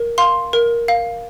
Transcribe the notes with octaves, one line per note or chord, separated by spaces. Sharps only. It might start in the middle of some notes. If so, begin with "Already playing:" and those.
Already playing: A#4
F5 C6
A#4
F5